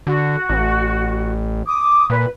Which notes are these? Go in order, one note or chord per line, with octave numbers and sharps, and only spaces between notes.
D3 F#4
A1
D6 D#6
A#2 B4